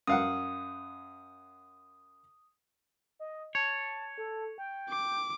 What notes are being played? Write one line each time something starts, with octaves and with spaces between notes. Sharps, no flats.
F#2 F5 F#5 D#6
D#5
C#5 A5
A4
G5
D6